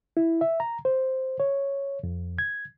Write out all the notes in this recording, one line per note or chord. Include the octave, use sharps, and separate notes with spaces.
E4
E5
A#5
C5
C#5
F2
G#6